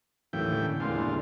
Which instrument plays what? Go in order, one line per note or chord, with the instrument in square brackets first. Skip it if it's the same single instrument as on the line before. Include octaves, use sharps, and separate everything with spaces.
[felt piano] D#2 [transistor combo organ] A2 E3 G5 [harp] F#3
[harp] D3 G3 A#3 [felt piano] C#4
[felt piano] E2 A#2 G#3 [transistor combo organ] D3 F4 [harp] C6 C7
[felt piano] G1 E2